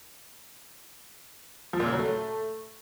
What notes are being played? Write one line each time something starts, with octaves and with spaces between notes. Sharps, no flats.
F3
A#2
C#3
F#3
A3